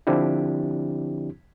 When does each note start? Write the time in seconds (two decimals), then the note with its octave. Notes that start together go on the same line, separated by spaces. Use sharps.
0.07 D3 F3 C4 D4 E4 G4